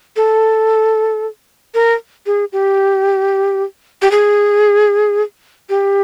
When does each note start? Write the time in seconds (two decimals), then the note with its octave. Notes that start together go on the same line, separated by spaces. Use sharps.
0.16 A4
1.74 A#4
2.26 G#4
2.52 G4
4.02 G4
4.11 G#4
5.69 G4